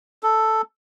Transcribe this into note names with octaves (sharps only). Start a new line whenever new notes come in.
A4